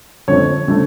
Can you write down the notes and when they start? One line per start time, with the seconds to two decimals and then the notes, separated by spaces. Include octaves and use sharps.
0.28 F2 D3 F3 A3 C#5
0.68 D3 F3 A3